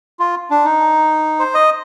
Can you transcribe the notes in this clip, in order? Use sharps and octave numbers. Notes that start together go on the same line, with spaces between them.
F4
D4
D#4
C5
D#5